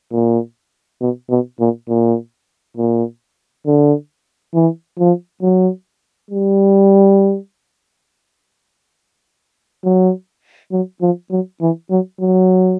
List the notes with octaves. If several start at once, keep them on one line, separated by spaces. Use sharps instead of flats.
A#2
B2
B2
A#2
A#2
A#2
D3
E3
F3
F#3
G3
F#3
F#3
F3
F#3
E3
F#3
F#3